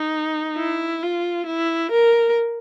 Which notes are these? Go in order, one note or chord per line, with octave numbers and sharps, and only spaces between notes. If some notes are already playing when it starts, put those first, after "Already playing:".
Already playing: D#4
E4
F4
E4
A#4